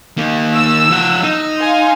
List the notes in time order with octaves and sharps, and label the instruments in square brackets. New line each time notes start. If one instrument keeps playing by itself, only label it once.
[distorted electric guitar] D#3 A#3
[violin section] E6
[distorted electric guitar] F3 F#5
D#4
[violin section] F5 G#5 C6